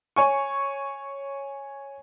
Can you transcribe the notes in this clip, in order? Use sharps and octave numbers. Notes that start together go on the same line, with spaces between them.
C#5 G#5 C#6